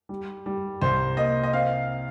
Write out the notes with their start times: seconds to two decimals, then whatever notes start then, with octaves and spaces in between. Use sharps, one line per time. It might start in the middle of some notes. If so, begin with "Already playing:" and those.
0.09 G3
0.46 G3
0.81 C2 C5
1.17 A#3 D#5
1.44 D#5
1.53 C4 F5